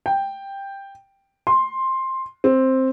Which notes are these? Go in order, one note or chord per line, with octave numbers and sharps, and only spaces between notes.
G5
C6
C4